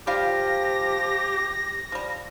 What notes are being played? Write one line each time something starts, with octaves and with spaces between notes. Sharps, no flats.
F3 G3 F4 G4 F5 A#6
F3 G3